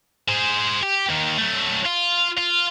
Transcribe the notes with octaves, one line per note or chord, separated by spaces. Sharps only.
G#4 C5
G4
D#2 D#3
F#3 A3
F4
F4